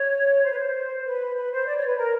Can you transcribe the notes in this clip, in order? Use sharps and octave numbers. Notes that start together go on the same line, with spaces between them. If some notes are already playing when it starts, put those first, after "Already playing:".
Already playing: C#5
C5
B4
C5
B4
B4
C5
D5
C#5
B4
A#4